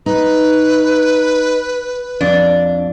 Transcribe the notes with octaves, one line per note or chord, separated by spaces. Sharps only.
D#4 B4
F2 D4